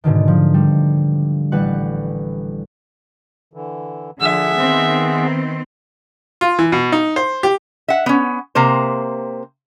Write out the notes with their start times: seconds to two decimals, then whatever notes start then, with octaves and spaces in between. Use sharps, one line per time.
0.04 G#2 B2 D3 D#3
0.28 F3
0.54 G3
1.52 A1 G3 B4 F#5 F#6
3.53 D3 E3
4.21 D3 F3 G#4 E5 F#5
4.57 D#3 B3 C4
6.41 F4
6.59 E3
6.72 B2
6.92 D#4
7.16 C5
7.43 G4
7.88 E5 F#5
8.06 B3 C#4
8.55 C3 A#3 C5